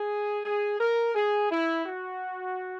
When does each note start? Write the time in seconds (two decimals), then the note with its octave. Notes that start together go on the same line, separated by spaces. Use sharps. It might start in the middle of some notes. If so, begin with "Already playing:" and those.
Already playing: G#4
0.44 G#4
0.80 A#4
1.15 G#4
1.51 E4
1.86 F#4